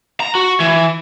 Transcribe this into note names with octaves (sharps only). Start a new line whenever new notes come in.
A#5
F#4
E3